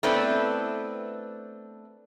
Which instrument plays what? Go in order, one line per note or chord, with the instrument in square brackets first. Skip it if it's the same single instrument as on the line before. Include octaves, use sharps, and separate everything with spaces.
[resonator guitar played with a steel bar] A3 B3 C4 D4 E4 B4